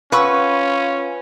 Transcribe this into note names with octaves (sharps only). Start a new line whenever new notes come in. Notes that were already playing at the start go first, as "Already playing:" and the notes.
C#4 F4 B4 F#5 C#6 E6